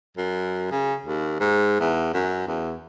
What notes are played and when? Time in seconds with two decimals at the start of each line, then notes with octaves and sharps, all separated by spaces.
0.17 F#2
0.71 C#3
1.05 D#2
1.40 G#2
1.80 E2
2.14 F#2
2.47 E2